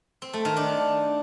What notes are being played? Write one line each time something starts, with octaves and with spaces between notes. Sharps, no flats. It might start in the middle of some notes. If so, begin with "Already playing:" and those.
C4
A3
D#3
D4